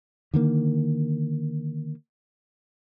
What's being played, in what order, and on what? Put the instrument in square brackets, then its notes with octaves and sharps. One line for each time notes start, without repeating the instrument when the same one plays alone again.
[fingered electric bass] D3 D#3 A#3